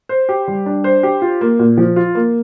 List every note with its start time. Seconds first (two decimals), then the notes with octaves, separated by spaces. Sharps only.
0.09 C5
0.29 G4
0.48 G3
0.66 D4
0.84 C5
1.03 G4
1.22 F4
1.41 A#3
1.59 A#2
1.77 F3
1.96 F4
2.15 A#3